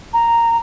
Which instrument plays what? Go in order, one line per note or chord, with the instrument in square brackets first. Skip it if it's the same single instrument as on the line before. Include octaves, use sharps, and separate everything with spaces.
[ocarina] A#5